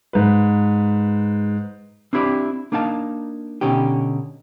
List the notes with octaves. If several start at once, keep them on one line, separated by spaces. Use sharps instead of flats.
G#2 B4
C4 D4 E4 G4 D5
A#3 D4 D#4 F5 A5
B2 D3 C#4 D#4 G4